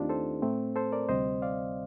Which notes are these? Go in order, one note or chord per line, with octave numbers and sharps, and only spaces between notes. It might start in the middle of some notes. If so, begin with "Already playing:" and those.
Already playing: D#2 D#3 A3 C4 D4 D#4 F4 G4
A4 C5
A2 A3 C4
A4 C5
A#4 D5
D2 C3 G3 C4 C5 D#5
D5 F5